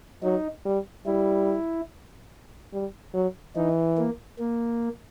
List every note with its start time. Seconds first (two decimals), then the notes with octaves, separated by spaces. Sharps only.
0.23 F#3 D#4
0.65 G3
1.06 G3 E4
2.73 G3
3.14 F#3
3.56 E3 D#4
3.98 A#3
4.39 A#3